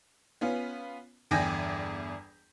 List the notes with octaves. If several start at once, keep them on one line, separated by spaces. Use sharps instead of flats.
B3 C#4 F4
G1 E2 D5 G5 G#5 A#6